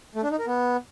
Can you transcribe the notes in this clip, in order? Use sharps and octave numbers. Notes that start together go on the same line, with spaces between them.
A3
D4
D#4
A#4
B3